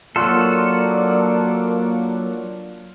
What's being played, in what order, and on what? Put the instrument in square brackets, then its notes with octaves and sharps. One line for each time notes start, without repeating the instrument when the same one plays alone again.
[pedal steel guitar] F#3 F#4 A4 [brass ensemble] A#3 [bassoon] D4 [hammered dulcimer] F4